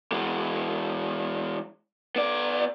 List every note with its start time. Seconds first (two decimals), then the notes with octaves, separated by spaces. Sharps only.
0.12 E3 G#3
2.16 B3 D5